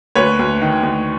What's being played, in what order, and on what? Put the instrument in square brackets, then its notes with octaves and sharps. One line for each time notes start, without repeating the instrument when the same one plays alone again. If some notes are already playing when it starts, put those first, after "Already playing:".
[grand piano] D2 B4 C#5
D2
D#3
D2